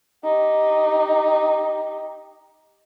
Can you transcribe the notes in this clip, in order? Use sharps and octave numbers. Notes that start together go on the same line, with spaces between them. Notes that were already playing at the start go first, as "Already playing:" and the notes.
D#4 G4